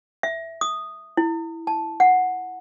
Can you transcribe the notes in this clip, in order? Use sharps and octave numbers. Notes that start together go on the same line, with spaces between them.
E5
D#6
E4
A5
F#5